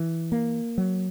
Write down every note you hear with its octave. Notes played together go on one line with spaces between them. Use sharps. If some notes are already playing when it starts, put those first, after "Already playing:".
Already playing: E3
A#3
F#3